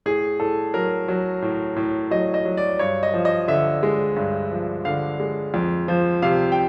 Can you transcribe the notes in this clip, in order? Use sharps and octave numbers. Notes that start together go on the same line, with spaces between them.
A2 G#4
A2 A4
F#3 A#4
F#3
A2
A2
F#3 D#5
D#5
F#3
D5
G2 C#5
D#5
F3
D#5
D3 E5
G#3
G2
F3
D3 F5
G#3
F2
F3
C3 F5
G5